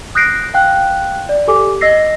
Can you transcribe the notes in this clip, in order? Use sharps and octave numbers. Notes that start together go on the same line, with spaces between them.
D#6 F#6 G6 A#6 C7 D7
F5 G5 F#6
D5
G4 A4 G#5 D6
D#5 E6 A#6 C7